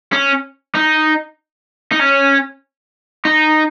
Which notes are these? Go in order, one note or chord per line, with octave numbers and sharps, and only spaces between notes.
C#4
D#4
D#4
C#4
D#4